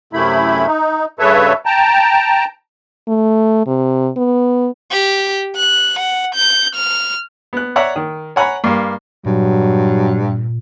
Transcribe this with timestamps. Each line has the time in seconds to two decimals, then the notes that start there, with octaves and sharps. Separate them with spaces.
0.13 F#2 C3 A3 E4 B5
0.67 D#4
1.19 G2 C#3 A4 B4 C#5 E5
1.66 G5 A5 A#5
3.08 A3
3.67 C3
4.17 B3
4.92 G4
5.56 F#6
5.99 F#5
6.35 G6
6.75 F6
7.53 B3 F#6
7.76 C#5 D5 E5 F#5 A#5
7.96 D#3
8.36 C#5 F#5 G#5 A#5 B5
8.64 G2 A#3
9.26 G2 A#2 F#3